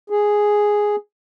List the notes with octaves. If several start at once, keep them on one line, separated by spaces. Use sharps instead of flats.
G#4